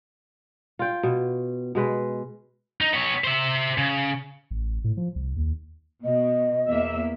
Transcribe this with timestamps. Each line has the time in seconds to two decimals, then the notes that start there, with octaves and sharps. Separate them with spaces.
0.79 F4 G5
1.03 B2
1.75 B2 G#3 B4
2.81 D#4
2.93 B3 C#5
3.24 C5 E5
3.78 C#3
4.51 A1
4.84 A2
4.97 F3
5.16 C2
5.36 D#2
6.05 B2 D#5
6.68 E2 A#3 E5